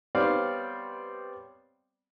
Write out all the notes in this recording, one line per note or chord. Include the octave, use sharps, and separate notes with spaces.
G3 B3 C4 C#5 D5 F5